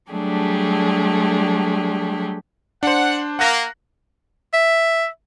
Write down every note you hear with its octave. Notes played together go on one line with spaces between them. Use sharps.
F#3 G3 A3 D4 G4 G#4
D4 C5 F#5
A#3 F#5 F#6 A#6
E5